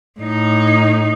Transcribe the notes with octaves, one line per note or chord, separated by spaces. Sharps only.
A2 D#4